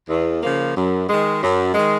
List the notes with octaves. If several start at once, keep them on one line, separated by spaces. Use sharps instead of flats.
E2
C#3 F3 A#3
F#2
D#3 G#3
F#2
D#3 G#3